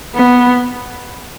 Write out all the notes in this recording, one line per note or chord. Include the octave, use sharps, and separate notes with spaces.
B3